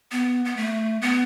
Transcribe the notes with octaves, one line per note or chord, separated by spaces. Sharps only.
B3
B3
A3
B3